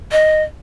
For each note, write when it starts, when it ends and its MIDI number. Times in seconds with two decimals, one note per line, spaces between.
0.12 0.42 75